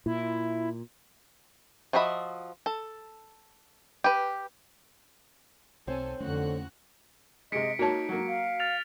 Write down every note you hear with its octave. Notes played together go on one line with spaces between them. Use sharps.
A#2 E4
F3 F#4 D#5 E5 B5
A4
G4 B4
B1 C4 A4 C5 C#5 G#5
F2 D3 A3 C#4 F#4 F#6
C3 G#3 D#5 B6 C#7 D7
A#3 D#4 F#4 C#5 A5
F#3 A#3
F5
F6 A6 F7